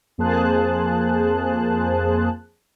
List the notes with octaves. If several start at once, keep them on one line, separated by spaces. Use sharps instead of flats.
F2 A#3 G#4 C5 A5 F#6